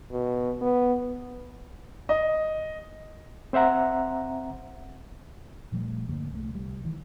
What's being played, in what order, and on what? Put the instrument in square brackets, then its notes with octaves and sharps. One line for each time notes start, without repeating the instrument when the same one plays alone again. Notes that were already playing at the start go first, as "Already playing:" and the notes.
[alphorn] B2
B3
[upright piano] D#5
[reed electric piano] C4 C5 E5 F#5 A#5
[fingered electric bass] A#2 F3 G3 A3
G2 D3 A3 A#3
C2 G#3 A3
C2 G3
D#3 E3